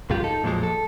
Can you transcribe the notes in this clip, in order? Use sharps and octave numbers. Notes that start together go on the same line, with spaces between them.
B1 F#2 G#3 F4 G4
D#4 A4
F2 A#2 F3 F#3 G#3
A4